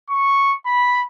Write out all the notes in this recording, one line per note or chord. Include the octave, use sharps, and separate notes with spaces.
C#6
B5